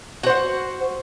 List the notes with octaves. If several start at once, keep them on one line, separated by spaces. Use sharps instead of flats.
F#4 C5 F#5